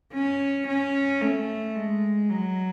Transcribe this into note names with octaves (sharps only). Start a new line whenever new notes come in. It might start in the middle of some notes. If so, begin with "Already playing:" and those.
C#4
C#4
A3
G#3
F#3